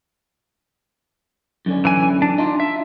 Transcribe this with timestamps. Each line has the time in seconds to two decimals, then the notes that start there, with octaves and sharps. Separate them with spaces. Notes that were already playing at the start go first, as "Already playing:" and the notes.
1.66 F#2 D3 C#4
1.85 E3 G#5
2.22 D4
2.38 D4 D#4 F4
2.60 E5